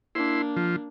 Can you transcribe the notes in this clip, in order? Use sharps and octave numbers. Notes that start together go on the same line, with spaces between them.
A#3 D4 E4 C6
F3